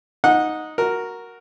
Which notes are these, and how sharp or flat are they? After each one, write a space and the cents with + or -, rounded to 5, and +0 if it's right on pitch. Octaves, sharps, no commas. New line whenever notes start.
D#4 +0 F#5 -20
F#4 +0 A#4 +0